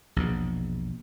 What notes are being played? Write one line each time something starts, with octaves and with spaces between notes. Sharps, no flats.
A#1 E2 B2